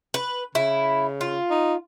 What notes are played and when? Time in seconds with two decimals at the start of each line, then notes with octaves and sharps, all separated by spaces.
0.14 B4
0.55 C#3 E4
1.21 F4
1.50 D#4